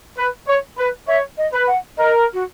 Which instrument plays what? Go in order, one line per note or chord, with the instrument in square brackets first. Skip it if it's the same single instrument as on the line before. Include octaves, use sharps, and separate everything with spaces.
[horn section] B4
C#5
B4
[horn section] C#5 [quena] E5
[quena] D#5
[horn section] B4
[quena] F#5
[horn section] A#4 [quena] D#5
[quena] F#4